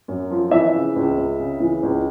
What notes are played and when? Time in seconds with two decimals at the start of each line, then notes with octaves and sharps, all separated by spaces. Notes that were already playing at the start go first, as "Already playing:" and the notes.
0.08 F#2
0.31 F3
0.51 E3 E5
0.73 C#3
0.96 C#2
1.17 C#2
1.40 C#3
1.60 E3
1.83 C#2